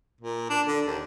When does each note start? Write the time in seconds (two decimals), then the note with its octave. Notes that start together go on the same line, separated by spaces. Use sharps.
0.21 A#2
0.50 D4
0.67 D3
0.86 D#2